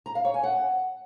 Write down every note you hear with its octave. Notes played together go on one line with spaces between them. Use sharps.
A#5
F5
C#5
G#5
F#5